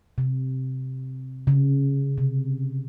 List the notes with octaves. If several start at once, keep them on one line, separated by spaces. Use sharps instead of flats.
C3
C#3
C3